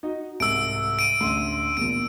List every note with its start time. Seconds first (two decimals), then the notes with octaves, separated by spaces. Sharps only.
0.03 D#4 F#4 D#5
0.40 C2 G#2 E6 D7
0.99 D7 D#7
1.20 A1 D2 C6
1.77 A#1 E2 A#2 D7